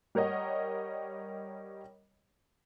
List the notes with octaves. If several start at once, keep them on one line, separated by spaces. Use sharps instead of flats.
G3 A#4 C#5 D#5 F#5